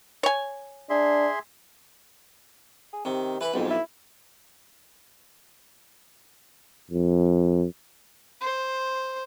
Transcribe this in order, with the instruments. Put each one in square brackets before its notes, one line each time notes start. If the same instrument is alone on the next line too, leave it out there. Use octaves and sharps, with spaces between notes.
[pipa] C#5 G#5
[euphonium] D4 [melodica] G#4 E5 C6
[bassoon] G#4
[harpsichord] C3 [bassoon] D#3
[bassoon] E3 [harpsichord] B4 B5
[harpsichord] B1 F2 [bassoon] G#2
[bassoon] E4
[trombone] F2
[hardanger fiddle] C5